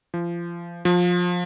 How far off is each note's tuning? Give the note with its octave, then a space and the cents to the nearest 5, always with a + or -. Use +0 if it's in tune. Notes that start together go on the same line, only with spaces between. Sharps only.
F3 -30
F3 +20